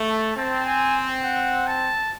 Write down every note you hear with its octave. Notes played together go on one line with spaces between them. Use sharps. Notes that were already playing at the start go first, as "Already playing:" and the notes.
Already playing: A3
A5
C4 A5
G#5
F#5
A5